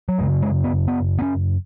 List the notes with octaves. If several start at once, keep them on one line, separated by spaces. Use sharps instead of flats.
F#3
F#2 C#3 G#3
G#3
B3
B3
B3
C#4